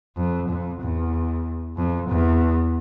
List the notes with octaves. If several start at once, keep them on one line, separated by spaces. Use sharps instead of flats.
F2
F2
E2
F2
E2